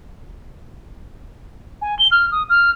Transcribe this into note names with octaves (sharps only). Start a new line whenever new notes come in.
G#5
G7
F6
D#6
F6